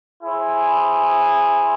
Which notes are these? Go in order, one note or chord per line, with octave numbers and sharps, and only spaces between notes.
E4 G#4 C5